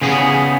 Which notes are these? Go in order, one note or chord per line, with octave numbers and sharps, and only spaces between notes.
C#3 B3 G#4